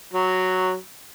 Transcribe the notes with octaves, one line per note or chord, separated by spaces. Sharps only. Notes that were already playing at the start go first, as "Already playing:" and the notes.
F#3